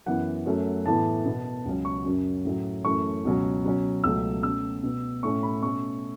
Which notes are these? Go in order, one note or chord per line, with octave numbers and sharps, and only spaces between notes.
F#2 E3 B3 F#5
F#2 F#3 A3 C#4
A2 E3 B3 A5
B2 B3
C#2 C#3 F#3 C#4
C#6
F#2 F#3 C#4
A2 F#3 C#4
F#2 E3 A3 C#4 C#6
C#2 B2 F#3 C#4
B2 F#3 C#4
C#2 B2 F#3 A3 E6
B2 A3 C#4 E6
B2 B3
A2 A3 C#4 C#6
B5
B2 A3 C#4 C#6